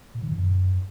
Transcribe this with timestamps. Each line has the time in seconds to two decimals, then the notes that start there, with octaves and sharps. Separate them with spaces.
0.14 A#2
0.23 D#3
0.31 F#2